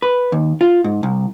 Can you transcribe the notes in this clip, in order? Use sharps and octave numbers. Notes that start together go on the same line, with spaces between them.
B4
D#2
F4
G#2
C2